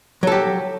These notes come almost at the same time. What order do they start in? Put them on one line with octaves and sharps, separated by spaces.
F#3 A4 G4